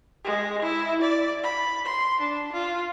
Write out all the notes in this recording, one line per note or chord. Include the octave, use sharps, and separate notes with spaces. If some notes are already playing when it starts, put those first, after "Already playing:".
G#3
E4
D5
B5
C6
D4
F4